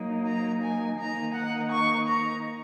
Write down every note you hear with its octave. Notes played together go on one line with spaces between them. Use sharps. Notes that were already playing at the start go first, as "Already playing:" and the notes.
Already playing: F#3 A#3 D#4
A#5
G#5
D#3 A#3 D#4 A#5
F#5
C#6
A#5